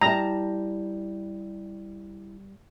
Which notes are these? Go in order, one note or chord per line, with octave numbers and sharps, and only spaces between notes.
G3 E4 A5 A#5